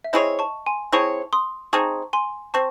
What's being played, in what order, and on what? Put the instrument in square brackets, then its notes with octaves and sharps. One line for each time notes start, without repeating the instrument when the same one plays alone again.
[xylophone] E5
[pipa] C4 E4 G#4 C#5 [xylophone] D#5
[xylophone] A5 C#6
G#5 C6
[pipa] C4 E4 G#4 C#5 [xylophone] A5 C#6
[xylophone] C6 D#6
[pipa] C4 D#4 G#4 [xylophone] A5 C#6
[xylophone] G#5 C6
[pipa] C4 [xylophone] A5 C#6